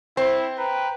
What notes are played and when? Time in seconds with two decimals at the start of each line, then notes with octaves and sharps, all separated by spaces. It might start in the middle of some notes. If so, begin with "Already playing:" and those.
0.17 C4 E4 C5
0.58 B4 G5 A#5